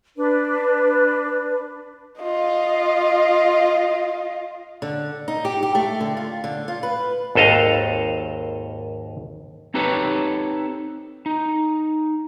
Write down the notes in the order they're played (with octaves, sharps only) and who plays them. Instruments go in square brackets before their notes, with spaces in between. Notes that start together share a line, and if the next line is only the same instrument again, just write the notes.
[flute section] D4 B4
[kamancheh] F4 D#5
[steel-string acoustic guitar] D3
D#4
G4
G4
A3
D3
F4
D3
F4
B4
[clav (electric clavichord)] G#1 D#2 A4 D#5 F5
[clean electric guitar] C4 D#4 G4 A4 B4 C#5
D#4